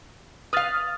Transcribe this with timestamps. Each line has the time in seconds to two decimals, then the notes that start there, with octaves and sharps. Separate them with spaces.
0.53 B4 F5 D#6 F6 A6